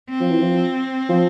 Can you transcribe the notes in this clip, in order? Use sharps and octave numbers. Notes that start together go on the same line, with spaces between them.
C4
F3
E3
F3
F3